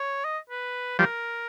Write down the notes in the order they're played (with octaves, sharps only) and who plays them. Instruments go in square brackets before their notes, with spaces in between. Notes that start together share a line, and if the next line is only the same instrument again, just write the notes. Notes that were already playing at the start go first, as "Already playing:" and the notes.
Already playing: [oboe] C#5
D#5
B4
[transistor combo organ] F3 G3 [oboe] A#4